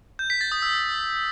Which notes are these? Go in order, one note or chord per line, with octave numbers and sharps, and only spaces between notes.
G6
B6
A6
D#6
E6